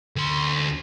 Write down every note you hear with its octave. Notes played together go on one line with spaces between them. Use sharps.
D2 C6